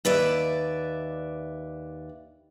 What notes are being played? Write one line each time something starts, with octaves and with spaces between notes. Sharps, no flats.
D#2 B4 D5 E5